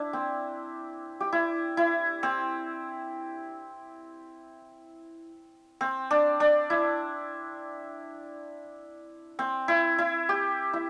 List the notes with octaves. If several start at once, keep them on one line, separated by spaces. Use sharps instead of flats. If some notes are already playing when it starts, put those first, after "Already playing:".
Already playing: D4 E4
C4
G4
E4
E4
C4
C4
D4
D4
E4
C4
E4
E4
G4
E4